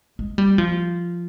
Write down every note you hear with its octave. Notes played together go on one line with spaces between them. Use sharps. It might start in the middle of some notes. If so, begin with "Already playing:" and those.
G#3
G3
F3